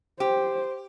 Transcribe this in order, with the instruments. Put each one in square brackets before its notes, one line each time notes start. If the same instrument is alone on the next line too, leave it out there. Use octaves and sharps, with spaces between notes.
[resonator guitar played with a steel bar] G4 [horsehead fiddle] C5